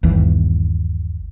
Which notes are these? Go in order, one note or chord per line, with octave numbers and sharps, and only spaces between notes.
G1 D#2 E3